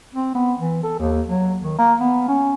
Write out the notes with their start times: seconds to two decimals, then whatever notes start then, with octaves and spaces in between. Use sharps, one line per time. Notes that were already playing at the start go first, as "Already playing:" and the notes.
0.15 C4
0.35 B3
0.58 E3
0.83 A4
0.99 D#2
1.27 F#3
1.62 D#3
1.79 A#3
2.00 B3
2.28 C#4